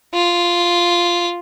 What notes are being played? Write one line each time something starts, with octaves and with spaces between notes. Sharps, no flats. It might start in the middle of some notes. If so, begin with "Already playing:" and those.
F4